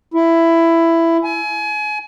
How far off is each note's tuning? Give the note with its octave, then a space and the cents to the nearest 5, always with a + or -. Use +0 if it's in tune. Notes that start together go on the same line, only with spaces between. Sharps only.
E4 +10
G#5 +30